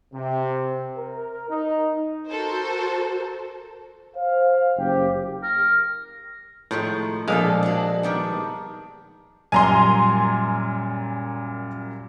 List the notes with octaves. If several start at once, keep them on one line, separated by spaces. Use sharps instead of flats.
C3
A#4
D#4
F#4 A4 A#4 C5
C5 F5
F#1 G4
A#4
A2 D#3 F3 G#3
A#1 B2 G#3 D4 A4 F5
D4 F#4
D#3 G3 B3
F#2 A#2 G3 G#5 A#5 C6